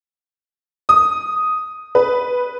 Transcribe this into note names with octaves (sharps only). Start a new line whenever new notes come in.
D#6
B4